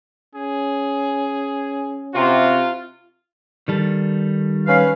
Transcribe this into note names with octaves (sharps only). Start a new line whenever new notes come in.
C#4 G#4
C3 F4 F#4
D#3 G3 A4
C#4 B4 F5